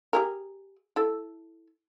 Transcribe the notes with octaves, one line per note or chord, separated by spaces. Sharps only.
G4 G#4 A#4
E4 A4